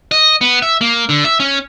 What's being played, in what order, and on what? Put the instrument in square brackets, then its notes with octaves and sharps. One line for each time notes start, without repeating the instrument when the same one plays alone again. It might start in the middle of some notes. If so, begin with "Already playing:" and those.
[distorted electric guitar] D#5
B3
E5
A#3
D3
E5
C#4